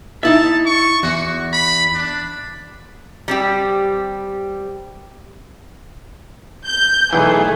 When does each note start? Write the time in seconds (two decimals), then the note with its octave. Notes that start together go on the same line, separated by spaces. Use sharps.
0.23 D#4 E4 E5 A5
0.66 C#6
1.03 E2 F#4
1.53 B5
1.94 D4
3.28 G3 C4 G4
6.67 G6
7.13 B1 E2 E3 A3 G#4